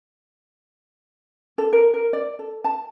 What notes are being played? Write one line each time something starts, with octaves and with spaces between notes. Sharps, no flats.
A4
A#4
A#4
D5
A4
A5